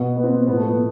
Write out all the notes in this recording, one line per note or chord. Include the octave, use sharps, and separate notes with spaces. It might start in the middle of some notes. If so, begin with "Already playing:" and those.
Already playing: B2 B3
B3
C4
B3
A2 F3 B3
A3
B3